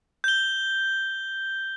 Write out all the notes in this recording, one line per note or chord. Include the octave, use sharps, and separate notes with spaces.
G6 G7